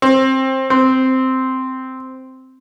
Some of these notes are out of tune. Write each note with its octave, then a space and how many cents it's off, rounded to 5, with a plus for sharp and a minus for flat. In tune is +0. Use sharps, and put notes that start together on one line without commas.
C4 +20
C4 -5